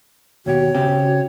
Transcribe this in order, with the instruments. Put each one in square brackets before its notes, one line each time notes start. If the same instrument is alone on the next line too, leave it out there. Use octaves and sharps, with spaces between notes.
[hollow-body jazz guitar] D#2 B2 G4 [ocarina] F#4 [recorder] C#5
[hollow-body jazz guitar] C#3 C4 G4